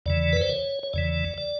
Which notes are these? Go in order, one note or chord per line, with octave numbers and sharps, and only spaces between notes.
E2 C#3 E3 D5
B4
C5
C#5
C#5
E2 C#3 E3 D5
D5